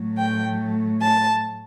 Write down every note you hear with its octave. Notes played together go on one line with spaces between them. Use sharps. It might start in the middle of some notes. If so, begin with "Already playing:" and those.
Already playing: A2 F#3 A3
G5
A5